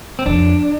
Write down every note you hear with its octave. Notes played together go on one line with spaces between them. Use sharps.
C4
F2 D4